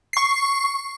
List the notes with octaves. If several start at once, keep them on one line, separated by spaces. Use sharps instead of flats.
C#6 C7